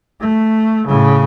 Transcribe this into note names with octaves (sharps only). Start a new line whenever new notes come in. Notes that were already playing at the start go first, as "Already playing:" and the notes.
A3
A2 C#3